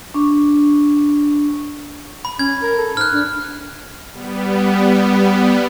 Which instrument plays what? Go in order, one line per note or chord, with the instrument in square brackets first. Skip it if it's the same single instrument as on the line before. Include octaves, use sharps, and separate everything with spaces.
[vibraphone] D4 C#6
[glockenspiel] B5
[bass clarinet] C#4 [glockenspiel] G#6
[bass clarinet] A#4
A4
[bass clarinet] G#2 [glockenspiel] F6 F#6
[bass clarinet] D4
[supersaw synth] G3 B3